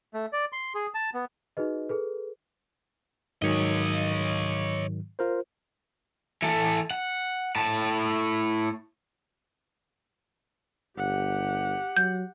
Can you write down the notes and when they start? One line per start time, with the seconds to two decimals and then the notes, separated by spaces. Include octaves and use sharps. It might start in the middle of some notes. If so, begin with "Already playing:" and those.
0.14 A3
0.33 D5
0.53 C6
0.75 G#4
0.95 A5
1.14 B3
1.57 D#4 F#4 G#4 B4 D#5
1.89 G#4 A4 B4
3.42 G#2 D#3 F#3 C#5 D#5
5.19 F4 A#4 C5
6.42 E3 A4
6.91 F#5
7.56 A2 A5
10.97 G1 G4 F#5
11.97 F#3 G6